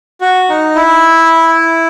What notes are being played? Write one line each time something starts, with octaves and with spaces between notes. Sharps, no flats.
F#4
D#4
E4